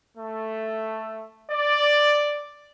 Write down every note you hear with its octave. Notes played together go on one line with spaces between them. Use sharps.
A3
D5